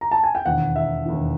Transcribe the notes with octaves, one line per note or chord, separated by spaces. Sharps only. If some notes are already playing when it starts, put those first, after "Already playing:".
A#5
A5
G#5
G5
E1 D#2 D#3 F#5
E5
E1 D#2 D#3